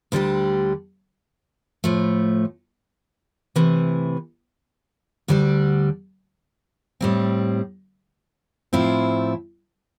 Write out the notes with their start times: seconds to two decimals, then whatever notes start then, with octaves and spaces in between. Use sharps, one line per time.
0.12 D2 D3 G3 D4 G4
1.84 A2 F3 A3
3.56 C3 E3 A3
5.28 D2 D3 G3 D4
7.01 A2 G3 C4
8.73 A2 F3 C4 E4